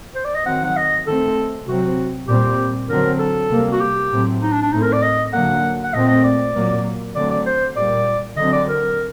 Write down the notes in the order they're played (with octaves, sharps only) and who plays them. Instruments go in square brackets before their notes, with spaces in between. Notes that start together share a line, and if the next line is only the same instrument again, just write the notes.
[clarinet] C5
D5
D#5
[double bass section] D#3 F#3 C4 [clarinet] F#5
[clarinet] F#5
D#5
[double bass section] D#3 A3 C4 [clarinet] A4
[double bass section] C3 F#3 C4 [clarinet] F#4
[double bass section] A#2 G3 C4 [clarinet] G4
[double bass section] D3 F#3 C4 [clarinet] A#4
[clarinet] A4
[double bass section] C3 G3 A#3
[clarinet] F#4
G4
[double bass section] A2 F#3 A3 C4
[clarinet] D#4
D4
D4
[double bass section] A2 A3 C4 [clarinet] D#4
[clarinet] A#4
D5
D#5
[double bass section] D3 F#3 A#3 [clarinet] F#5
[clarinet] F#5
[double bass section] A#2 A3 C4 [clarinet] D#5
[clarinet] D#5
D5
[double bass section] A#2 F#3 A#3
[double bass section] D3 F#3 A3 C4 [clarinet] D5
[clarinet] D5
C5
[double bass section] A#2 G3 A#3 [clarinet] D5
[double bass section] D3 F#3 C4 [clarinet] D#5
[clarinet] D5
A#4